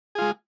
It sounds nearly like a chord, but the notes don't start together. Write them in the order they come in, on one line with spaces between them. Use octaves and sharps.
G#4 F4 G#3